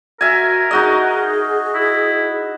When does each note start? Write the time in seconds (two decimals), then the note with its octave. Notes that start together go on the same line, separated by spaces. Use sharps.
0.21 F#4 A#4 E5 G#5
0.71 D#4 F#4 G#4 D#5
1.74 E4